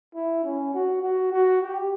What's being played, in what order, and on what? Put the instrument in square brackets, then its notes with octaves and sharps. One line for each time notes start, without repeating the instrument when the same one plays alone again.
[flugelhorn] E4
C#4
F#4
F#4
F#4
G4